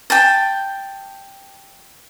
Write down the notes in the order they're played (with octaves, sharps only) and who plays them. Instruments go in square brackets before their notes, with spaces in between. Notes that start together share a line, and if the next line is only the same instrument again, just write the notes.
[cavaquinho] G5 A5